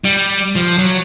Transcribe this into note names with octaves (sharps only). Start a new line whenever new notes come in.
G3
F3
F#3